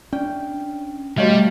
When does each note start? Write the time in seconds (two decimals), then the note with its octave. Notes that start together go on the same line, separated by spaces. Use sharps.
0.13 C#4 D4 D5 G5
1.18 G3 A3 F#4 C#5 D#5 F5